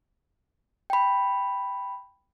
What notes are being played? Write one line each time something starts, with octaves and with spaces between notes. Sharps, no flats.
G5 B5